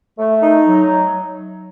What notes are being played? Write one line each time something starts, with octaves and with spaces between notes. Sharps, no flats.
A3
D#4
F#3